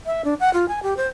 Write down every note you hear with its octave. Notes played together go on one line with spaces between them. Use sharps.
E5
D4
F#5
F4
G#5
G4
C5